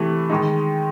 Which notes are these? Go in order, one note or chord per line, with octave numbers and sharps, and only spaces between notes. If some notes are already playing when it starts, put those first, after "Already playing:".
Already playing: C3 E3 A3
D#3 G#3 D#4